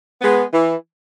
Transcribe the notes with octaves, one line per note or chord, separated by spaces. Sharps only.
G#3 B3
E3